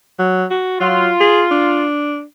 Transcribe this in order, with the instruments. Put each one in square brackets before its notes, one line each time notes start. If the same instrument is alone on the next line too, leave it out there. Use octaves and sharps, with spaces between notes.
[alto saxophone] F#3
F#4
[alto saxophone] F#3 [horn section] F4
[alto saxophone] G#4
D4